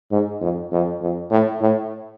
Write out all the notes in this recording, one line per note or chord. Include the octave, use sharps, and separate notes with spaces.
G#2
F2
F2
F2
A2
A2